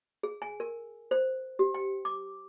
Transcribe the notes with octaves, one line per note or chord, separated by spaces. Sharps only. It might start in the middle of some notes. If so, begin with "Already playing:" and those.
G#4
G#5
A#4
C5
G4
G5
D6